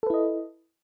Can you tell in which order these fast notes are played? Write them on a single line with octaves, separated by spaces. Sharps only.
A4 B4 E4 D#5